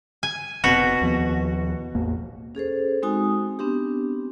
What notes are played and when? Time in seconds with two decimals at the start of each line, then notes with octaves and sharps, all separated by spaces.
0.23 G#5
0.64 F1 B2 B3 C4 F#4
1.01 D#2 F3 B3
1.95 A1 E2 A#3
2.55 C#4 G#4 A4 C5
3.03 G#3 C4 D#4 F#4 G#5 D#6
3.59 B3 C4 D4 G4